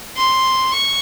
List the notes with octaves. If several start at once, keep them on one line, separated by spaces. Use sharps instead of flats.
C6
C#6